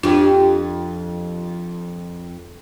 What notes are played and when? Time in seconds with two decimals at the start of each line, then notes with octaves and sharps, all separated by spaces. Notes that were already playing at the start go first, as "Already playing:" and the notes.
0.03 F2 D4 F4 G4